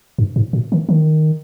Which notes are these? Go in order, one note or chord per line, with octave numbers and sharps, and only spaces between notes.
G2
G#2
A#2
D#3
D#3